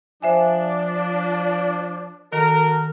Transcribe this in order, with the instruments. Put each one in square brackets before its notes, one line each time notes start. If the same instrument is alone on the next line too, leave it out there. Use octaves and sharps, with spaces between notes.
[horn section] F3 D4 [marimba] C5 E5 G#5
[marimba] D#3 [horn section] F#4 A4 A#4